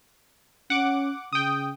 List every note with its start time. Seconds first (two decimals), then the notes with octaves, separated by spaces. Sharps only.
0.70 C#4 F#5 D6
1.33 C#3 G5 D#6